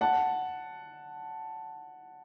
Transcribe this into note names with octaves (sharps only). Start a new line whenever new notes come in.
F#5 A5